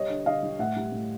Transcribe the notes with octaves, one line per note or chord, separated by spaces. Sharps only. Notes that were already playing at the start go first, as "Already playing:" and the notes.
Already playing: G3 C#5 D#5
D3
D3 D#5 F5
G3
A2 E5 F#5
G3
A2